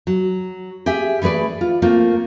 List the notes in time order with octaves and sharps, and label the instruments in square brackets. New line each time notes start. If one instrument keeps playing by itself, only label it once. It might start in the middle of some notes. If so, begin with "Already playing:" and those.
[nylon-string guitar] F#3
G4 G#4 E5 G#5
E3 A3 G#4 B4 D5
F4
A3 A#3 C4 F4